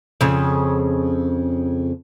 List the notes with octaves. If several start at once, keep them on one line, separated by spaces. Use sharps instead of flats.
F2 C#3